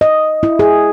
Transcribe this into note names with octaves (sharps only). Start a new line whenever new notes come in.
D#5
E4
G#4